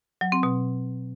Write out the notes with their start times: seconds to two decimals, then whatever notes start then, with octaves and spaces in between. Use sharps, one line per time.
0.21 F#3
0.32 C4
0.43 B2